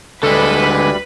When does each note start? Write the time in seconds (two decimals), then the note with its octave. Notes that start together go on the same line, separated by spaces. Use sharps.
0.23 D2 D3 G3 G#3 A4 B4 B5